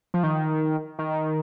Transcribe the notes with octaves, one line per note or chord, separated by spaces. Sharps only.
F3
D#3
D#3